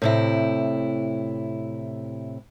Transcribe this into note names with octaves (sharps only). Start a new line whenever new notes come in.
A2 C3 E4